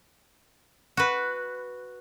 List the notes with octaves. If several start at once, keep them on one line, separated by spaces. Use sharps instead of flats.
F#4 B4